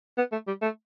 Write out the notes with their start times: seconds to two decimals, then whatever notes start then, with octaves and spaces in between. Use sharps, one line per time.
0.17 B3
0.32 A3
0.47 G3
0.62 A3